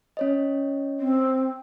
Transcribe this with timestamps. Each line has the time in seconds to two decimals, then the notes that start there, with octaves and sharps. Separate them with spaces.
0.17 C#4 C#5 D#5
1.00 C4